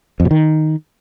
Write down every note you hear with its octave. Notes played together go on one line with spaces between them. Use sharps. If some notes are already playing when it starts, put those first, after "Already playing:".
F2
B2
D#3